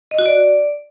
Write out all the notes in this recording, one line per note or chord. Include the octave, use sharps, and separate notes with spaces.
D#5
F#4
D5